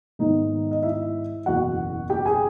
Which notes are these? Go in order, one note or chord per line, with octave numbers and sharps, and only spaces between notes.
G#2 D#3 G#3 B3 D#4 D#5
D#5
E4 E5
F#1 E2 B2 F#4 F#5
G4 G5
G#4 G#5